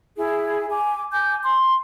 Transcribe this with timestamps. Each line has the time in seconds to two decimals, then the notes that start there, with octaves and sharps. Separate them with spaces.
0.15 E4 G#4
0.70 G#5 D6
1.11 G#5 D6 G6
1.43 C6